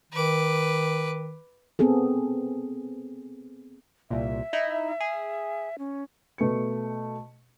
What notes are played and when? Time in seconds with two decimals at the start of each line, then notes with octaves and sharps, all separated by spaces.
0.13 D#3 B4 D6
1.79 B3 C4 G#4 A4
4.11 C2 A#2 E5
4.53 D#4 E4
5.00 G#4
5.79 C#4
6.38 B2 A3 B4 C#7